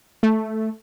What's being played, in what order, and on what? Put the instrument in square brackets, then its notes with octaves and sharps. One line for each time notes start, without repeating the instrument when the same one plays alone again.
[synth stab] A3